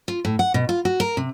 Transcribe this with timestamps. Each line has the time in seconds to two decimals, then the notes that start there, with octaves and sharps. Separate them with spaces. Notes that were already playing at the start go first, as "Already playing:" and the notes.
0.08 F4
0.25 A2
0.39 F#5
0.54 B2
0.69 F4
0.85 F#4
1.00 A#4
1.17 C3